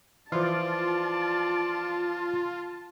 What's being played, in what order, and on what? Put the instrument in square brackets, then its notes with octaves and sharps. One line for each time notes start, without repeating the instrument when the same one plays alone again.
[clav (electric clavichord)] E3 F3 [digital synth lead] F4 [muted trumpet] D5 [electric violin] A5